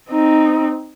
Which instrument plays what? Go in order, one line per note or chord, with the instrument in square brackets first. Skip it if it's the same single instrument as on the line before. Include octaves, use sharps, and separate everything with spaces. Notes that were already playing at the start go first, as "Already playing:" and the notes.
[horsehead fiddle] C4 D#4